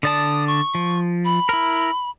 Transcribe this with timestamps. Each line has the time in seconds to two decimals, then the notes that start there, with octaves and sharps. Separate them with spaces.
0.03 D3 D5 A5 D#6
0.47 C#6
0.75 F3
1.25 B5
1.49 E4 A#4